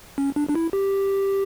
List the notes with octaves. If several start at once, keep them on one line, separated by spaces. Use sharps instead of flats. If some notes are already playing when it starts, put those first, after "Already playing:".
C#4
D4
D4
E4
G4